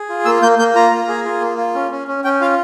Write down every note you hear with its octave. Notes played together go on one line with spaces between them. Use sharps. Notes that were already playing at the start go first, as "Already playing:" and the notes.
Already playing: G#4
F4
A#3 E6
A#3 G6
A#3 G6
F4 A#5
A#3
G#4
F4
A#3
F4
C#4
C#4
C#4
C#4 G5
F4 F5